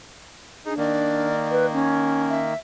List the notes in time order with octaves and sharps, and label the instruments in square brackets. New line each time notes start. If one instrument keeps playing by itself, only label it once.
[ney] D4 [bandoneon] D#4 [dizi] G#4
[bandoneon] D#3 A#3 [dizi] D5
[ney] B4
C#4
[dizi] E5